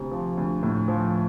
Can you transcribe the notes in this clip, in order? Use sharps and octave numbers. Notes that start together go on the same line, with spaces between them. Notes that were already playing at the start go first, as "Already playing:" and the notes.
Already playing: D2 C3
F3
D2
A2
F3